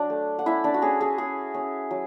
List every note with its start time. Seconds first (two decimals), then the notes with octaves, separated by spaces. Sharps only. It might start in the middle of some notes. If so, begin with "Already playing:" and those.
Already playing: F#3 D4 D5
0.10 A3
0.39 F#5
0.46 C#4 E4 E5
0.64 D4 D5
0.74 F#4
0.82 C#4 G#4
1.01 G#4
1.18 C#4 G#4
1.54 C#4
1.91 F#3